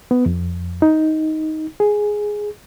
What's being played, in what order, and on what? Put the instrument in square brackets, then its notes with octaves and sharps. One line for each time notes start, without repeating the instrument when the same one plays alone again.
[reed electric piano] B3
F2
D#4
G#4